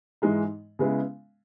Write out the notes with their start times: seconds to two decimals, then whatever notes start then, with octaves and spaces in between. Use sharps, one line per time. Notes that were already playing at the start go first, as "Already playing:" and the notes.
0.22 G#2 E3 G#3 D#4
0.79 C#3 G#3 B3 E4